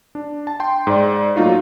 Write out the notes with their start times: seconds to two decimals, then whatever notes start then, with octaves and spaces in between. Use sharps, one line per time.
0.15 D4
0.47 A5
0.60 G5 C6
0.87 G#2 D5
1.36 F#3 A3 A#3 D#4 F4 F#4